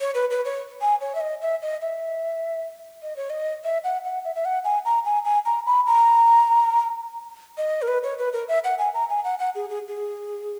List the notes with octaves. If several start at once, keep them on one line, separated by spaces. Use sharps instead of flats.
C#5
B4
B4
C#5
G#5
C#5
E5
D#5
E5
D#5
E5
D#5
C#5
D#5
E5
F#5
F#5
E5
E5
F#5
G#5
A#5
G#5
G#5
A#5
B5
A#5
D#5
A#4
B4
C#5
B4
A#4
E5
F#5
G#5
A#5
G#5
F#5
F#5
G#4
G#4
G#4